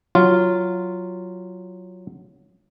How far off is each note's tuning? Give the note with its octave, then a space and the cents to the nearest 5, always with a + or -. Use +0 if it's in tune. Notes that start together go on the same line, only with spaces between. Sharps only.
F#3 +0 F4 +0